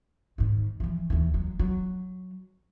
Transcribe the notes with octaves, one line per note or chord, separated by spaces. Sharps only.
G#2 D#3
E3 F3
D#2 E3
F#3 G#3
F#3